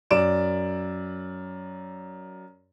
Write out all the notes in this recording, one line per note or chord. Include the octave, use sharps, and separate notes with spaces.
F#2 D5 D7 E7